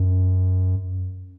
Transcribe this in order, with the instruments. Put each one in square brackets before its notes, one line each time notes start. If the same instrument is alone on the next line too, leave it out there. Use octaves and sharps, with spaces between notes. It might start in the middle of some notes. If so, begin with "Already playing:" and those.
Already playing: [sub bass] F#2